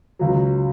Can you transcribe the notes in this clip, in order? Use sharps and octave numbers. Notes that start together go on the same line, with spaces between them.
C#2 C#3 F#3